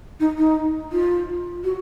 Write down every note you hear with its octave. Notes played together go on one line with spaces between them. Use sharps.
D#4
D#4
F4
F#4